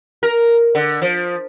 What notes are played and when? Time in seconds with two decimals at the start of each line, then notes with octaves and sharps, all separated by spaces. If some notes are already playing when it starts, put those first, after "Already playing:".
0.23 A#4
0.75 D3
1.02 F3